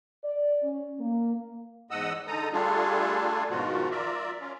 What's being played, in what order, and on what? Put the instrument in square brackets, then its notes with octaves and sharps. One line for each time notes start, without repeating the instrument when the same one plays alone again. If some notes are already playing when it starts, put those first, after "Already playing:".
[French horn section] D5
C#4
A#3
[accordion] E2 G#2 D#5 F#5 D#6 E6
D3 G#3 D#4 A4 A#5 D#6
G3 A3 D4 F4 G#4 A4
G#2 B2 D#3 F3 F4 F#4
F4 A#4 D5 E5
C#4 F4